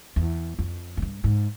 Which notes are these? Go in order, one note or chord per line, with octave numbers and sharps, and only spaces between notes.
E2
F2
G#2
G2
G#2